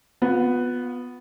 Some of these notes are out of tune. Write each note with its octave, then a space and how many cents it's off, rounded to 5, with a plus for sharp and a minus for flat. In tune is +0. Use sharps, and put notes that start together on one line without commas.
B3 +0 F4 +35